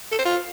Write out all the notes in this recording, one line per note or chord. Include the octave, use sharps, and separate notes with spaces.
A4
C5
F4